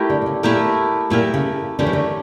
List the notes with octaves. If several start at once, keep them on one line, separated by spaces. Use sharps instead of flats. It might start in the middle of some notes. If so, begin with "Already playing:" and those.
Already playing: A3 E4 G4 A#4
D3
A#2
C#3
A#2 A3 E4 G4 A#4
A#2 A3 E4 G4 A#4
C#3
D3 A3 C#4 G4 A#4
E3
D3